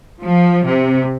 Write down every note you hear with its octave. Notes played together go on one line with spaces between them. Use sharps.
F3
C3